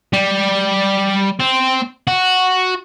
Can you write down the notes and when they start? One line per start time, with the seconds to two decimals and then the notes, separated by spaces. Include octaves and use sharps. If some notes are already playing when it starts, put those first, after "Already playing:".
0.13 G3
1.40 C4
2.07 F#4